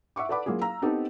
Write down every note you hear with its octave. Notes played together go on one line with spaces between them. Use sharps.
E5 F#5 C#6 D6
A4 B4 D5 F#5 B5 D6
F#3 A#3 E4 F4 G#4
F5 A#5 E6
B3 C4 D#4 G4 A4